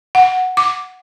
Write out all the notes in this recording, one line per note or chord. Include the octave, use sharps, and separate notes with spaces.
F#5
D6